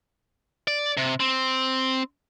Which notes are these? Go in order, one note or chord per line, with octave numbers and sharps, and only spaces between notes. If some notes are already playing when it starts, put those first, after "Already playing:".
D5
C3
C4